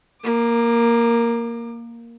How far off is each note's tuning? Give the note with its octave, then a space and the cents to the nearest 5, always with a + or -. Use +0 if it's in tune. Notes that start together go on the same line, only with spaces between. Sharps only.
A#3 +0 D6 +30